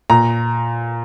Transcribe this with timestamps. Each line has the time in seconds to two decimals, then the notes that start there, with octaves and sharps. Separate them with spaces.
0.10 A#2 A#5